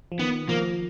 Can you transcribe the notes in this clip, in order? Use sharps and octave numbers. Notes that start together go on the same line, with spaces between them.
F3
D#3 B3
F3 A#3